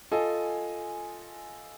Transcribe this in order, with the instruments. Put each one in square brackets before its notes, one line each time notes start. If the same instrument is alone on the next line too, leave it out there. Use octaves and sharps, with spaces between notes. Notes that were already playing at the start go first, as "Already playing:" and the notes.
[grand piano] F4 A4 D#5 G#5